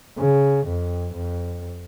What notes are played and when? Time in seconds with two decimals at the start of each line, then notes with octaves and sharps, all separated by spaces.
0.18 C#3
0.67 F2
1.14 F2